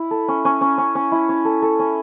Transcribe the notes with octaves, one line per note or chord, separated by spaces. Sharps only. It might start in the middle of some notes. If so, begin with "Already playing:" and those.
Already playing: E4
A4
C#4
C#4
C#4
C#4
C#4
E4
C#4
A4
A4
C#4